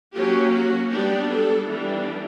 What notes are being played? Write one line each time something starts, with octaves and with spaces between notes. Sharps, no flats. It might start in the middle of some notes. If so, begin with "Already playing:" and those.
F#3 A#3 C#4 G4
F#4
G3 B3 D4 G4
A4
E3 G3 B3 D4